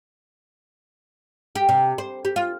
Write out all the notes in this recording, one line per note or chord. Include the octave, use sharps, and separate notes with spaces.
G4
C3
C5
G4
F4